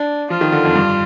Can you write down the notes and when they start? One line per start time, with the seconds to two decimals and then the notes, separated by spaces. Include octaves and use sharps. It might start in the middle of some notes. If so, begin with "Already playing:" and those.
Already playing: D4
0.30 F3 F4
0.41 D#3
0.52 D3
0.65 F2
0.75 G2